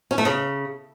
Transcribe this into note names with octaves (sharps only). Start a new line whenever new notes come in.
C#4
A3
C#3